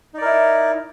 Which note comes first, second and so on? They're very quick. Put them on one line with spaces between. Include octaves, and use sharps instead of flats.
D#4 D5 A#4 E4